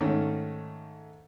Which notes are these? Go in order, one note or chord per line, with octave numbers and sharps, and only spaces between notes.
G#2 D#3 A3 C#4